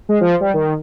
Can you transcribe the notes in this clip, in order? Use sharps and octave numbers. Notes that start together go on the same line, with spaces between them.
G#3
F3
G3
D#3